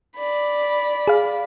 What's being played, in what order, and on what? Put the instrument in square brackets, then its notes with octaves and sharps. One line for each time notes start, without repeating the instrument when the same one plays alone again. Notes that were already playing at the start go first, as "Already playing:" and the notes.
[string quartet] D5 B5
[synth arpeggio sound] G#4 F5